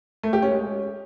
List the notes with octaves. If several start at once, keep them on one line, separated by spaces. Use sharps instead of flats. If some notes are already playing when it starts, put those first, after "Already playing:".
A3
G4
C#4
G#3